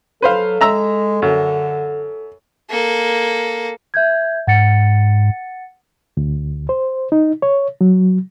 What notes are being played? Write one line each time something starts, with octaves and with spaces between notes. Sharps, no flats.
F#3 A4 B4 C5 F5
G#3 E5 A#5 E6
F#2 D3
A#3 A4
E5 G6 G#6
G#2 F#5 A6 C#7
D2
C5
D#4
C#5
F#3